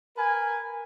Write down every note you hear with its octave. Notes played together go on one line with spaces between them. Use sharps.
A#4 B4 G#5